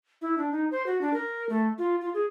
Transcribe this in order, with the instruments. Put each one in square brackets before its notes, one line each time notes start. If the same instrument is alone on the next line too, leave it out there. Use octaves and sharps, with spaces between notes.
[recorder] E4
D4
D#4
C5
F#4
D4
A#4
A3
F4
F4
G#4